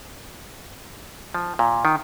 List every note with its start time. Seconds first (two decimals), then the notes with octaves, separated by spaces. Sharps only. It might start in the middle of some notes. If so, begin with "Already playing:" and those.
1.34 F3
1.59 A#2
1.85 D#3